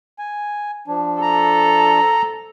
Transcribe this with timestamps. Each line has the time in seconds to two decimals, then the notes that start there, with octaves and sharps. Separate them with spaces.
0.19 G#5
0.88 F3 D4
1.22 A4 A#5